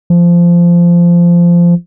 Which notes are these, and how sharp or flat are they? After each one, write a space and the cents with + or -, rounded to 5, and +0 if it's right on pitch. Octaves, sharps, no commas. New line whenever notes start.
F3 -15